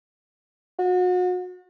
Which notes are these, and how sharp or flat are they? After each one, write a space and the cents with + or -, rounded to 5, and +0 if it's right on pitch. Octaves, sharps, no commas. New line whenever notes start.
F#4 -35